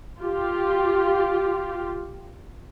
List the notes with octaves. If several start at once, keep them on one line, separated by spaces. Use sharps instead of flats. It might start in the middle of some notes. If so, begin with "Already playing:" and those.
F4 G4